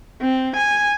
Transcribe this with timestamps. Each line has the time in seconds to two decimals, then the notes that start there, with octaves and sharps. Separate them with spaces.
0.22 C4
0.56 G#5